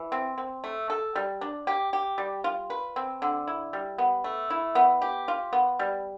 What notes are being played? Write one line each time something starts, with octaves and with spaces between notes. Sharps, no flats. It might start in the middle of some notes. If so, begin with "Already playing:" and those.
Already playing: E3
C4
C4
A3
A4
G3
D4
G4
G4
G3
F4
B4
C4
D3
E4
G3
B3
A3
E4
B3
G4
F4
B3
G3